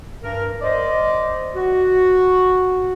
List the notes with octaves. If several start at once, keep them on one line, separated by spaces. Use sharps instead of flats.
G2 A#4
C5 D5 D#5
F#4